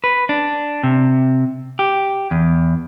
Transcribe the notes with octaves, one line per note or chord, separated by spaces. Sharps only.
B4
D4
C3
G4
E2